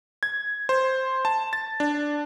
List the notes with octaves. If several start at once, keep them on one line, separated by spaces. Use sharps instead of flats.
G#6
C5
A5
A6
D4